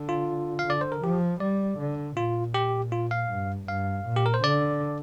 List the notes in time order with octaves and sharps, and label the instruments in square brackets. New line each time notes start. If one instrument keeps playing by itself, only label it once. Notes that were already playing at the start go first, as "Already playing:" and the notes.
Already playing: [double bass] D3
[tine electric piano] F4
F5
[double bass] D3 [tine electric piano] D5
[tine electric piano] C5
A#4
[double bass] F3 [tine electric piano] G4
[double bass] G3 [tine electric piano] D5
[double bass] D3
[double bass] A#2 [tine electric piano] F4
[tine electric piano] G4
F4
F5
[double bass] G2
[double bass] G2 [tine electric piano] F5
[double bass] A#2
[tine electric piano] G4
A#4
C5
[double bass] D3 [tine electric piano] D5